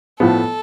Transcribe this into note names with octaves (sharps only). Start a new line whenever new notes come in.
A2 F3 B3 A4